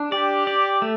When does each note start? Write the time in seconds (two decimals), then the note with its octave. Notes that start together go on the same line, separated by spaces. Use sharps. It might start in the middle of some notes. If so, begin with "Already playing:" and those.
Already playing: D4
0.12 G4 D5
0.47 D5
0.82 A3